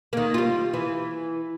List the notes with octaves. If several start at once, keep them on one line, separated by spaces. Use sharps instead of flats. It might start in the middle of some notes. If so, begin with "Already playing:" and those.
D#3 A#3
G3 F4
E3